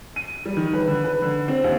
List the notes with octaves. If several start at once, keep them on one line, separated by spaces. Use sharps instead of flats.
D#7
G3
D#3
B4
D3
B4
D3
C4
D#2